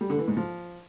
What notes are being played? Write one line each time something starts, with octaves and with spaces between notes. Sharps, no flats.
G3
D3
E3
G#2
F3